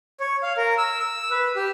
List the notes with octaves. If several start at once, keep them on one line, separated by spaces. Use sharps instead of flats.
C#5
F5
A#4
E6
E6
B4
G4